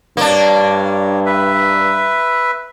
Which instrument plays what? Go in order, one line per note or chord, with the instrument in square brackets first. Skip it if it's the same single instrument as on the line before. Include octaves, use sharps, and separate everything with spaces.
[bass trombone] G2 [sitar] A#3 D4 [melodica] C#5
[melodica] B4 E5